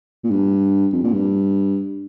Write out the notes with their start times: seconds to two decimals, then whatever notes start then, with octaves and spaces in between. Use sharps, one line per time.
0.24 A#2
0.31 G2
0.93 F2
1.04 A#2
1.13 G2